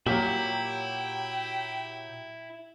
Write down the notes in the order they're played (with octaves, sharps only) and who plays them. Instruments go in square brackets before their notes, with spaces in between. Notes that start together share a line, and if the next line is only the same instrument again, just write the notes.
[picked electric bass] A#2 [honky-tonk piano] F#3 G4 [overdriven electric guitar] E4 [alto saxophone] G5